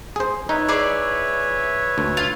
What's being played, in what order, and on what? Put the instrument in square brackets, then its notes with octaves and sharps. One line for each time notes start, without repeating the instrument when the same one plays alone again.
[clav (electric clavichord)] G#4 C5
[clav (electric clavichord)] D#4 [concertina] B4 C#5 E5
[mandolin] E4 G#4 D5
[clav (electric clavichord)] D2
[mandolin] F4